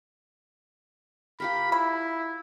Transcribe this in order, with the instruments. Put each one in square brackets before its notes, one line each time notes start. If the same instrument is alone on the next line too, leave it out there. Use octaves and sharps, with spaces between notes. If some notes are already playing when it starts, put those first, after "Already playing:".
[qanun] F4 G4 A#4 [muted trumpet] B5
[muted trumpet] E4 [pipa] B5